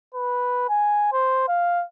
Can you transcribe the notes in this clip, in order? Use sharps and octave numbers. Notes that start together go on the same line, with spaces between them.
B4
G#5
C5
F5